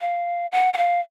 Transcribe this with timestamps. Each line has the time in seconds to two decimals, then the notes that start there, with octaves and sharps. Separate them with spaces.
0.01 F5
0.52 F#5
0.74 F#5
0.77 F5